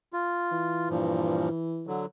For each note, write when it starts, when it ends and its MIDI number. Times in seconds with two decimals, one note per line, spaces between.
0.13 0.89 65
0.52 1.93 52
0.89 1.49 43
0.89 1.49 46
0.89 1.49 53
1.87 2.06 50
1.87 2.06 54